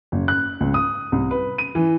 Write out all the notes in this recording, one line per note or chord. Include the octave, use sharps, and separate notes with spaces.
F#1
F#6
C#2
D#6
C2
B4
D#7
E3